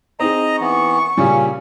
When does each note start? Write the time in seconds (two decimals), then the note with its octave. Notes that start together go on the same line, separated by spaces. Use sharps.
0.20 C4 D#4 G#4 D#5 A#5
0.61 E3 B3 C#6
1.17 A#2 C#3 G3 C#4